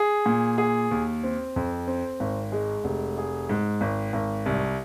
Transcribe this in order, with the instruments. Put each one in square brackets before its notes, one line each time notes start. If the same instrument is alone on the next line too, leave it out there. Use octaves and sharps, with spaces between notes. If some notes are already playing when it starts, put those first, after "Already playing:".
Already playing: [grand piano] G#4
A#2
G#4
D#2
C4
F2
C4
G#1
G#3
F1
G#4
G#2
G#1
G#1
C2